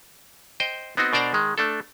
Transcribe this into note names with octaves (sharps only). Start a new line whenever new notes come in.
C5 D#5 G5
B3 C4 D#4 F#4
B2 D4 A#4 C5 D5 A#5
D#3 G#3
A3 D4 A4